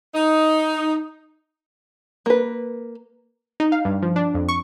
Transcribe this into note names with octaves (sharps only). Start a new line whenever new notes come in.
D#4
A#3 B4
D#4
F5
G2
F3
D4
F2
C#6